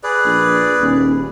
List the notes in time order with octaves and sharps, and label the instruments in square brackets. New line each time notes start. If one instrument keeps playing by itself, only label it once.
[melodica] G#4 B4 D5
[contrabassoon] A#1
D#1